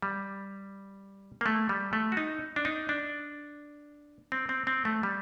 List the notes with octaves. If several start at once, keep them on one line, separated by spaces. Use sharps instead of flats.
G3
A#3
A3
G3
A3
F#4
D#4
D4
D#4
D4
C4
C4
C4
A3
G3